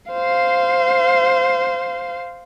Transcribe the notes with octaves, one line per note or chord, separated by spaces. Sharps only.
C5 F5